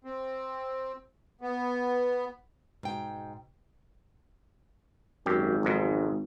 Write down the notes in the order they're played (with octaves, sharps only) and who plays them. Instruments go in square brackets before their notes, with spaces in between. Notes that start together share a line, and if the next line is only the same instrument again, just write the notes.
[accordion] C4
B3
[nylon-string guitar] G#2 G5 [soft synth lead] B2
[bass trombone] G#1 [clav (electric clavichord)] F#2 G4
[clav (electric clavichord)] B1 F2 G#2